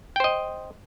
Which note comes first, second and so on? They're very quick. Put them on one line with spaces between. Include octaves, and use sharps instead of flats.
G5 C5 D#5